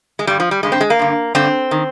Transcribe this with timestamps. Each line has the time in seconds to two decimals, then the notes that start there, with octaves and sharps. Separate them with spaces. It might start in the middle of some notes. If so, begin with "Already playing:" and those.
0.19 G#3
0.27 G2 D3 G3
0.40 F3
0.51 G3
0.63 G2 D3 G#3
0.72 C4
0.81 G#3
0.90 A#3
0.99 G2 D3
1.35 G2 D3 C4
1.71 D#3